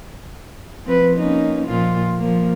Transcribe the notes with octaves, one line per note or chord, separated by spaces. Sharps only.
F3 C4 B4
A#3 C#4 D#4
A#2 F3 F4
F3 A#3